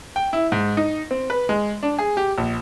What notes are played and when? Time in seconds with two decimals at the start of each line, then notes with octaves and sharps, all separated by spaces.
0.16 G5
0.33 E4
0.52 G#2
0.77 D#4
1.11 C4
1.30 B4
1.49 G#3
1.83 D4
1.98 G#4
2.17 G4
2.38 A#1